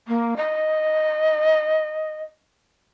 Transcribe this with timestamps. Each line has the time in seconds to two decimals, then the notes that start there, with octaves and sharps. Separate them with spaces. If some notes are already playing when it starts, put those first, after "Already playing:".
0.08 A#3
0.37 D#5